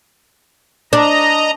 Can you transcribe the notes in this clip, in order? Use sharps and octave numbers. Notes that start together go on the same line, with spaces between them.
D4 D#5 A#5